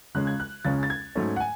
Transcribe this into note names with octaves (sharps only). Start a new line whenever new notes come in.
C#2 C#3 G#3 C#4 F#6
G#6
F#6
C#2 C#3 G#3 C#4 A6
A6
G#6
G#2 F#3 A3 C#4
F#5
G#5